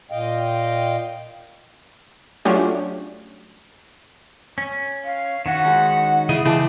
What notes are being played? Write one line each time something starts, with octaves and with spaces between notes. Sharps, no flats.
A#2 D#5 F5 G5
F#3 A3 C#4 D4 F4 G4
C#4
F5
D#3 C#4 F#4 F#5
G#3 D#4
C#3 E4 D#5
C#3 E3 G5 A5 C6 D6